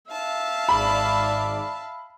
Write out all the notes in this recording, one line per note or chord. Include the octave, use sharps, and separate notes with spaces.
E5 F5 A5
G#1 G#2 D5 B5